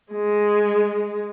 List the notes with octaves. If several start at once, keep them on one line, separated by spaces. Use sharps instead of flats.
G#3